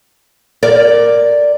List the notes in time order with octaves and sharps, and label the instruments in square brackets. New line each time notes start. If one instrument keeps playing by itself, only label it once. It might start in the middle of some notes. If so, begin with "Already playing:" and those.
[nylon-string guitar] A#4 D5